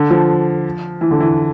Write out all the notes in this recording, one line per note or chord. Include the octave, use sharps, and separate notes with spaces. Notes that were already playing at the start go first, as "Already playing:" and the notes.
Already playing: D3
F3
E3
D3
E3